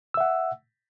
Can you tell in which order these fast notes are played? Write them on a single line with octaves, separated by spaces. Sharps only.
E6 E5 F#5